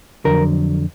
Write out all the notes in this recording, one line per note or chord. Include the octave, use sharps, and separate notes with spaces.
F2 D3 F#3 A#4